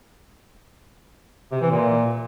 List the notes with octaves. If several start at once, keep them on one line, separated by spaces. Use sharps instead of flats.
C3
E3
A#2